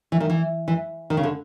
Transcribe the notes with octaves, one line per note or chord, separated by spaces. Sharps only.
E3
D#3
E3
E3
D#3
C#3
D3